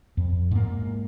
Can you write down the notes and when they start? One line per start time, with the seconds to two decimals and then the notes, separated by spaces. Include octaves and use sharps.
0.17 F2
0.51 G#2 A#3